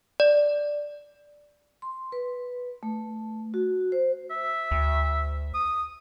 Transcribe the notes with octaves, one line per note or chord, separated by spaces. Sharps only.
D5
C6
B4
A3
F#4
C5
E5
D2
D#6